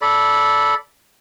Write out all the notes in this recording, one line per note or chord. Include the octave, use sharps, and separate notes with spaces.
A4 D5 B5